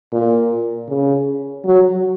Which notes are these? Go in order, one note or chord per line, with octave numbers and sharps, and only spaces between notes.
A#2
C#3
F#3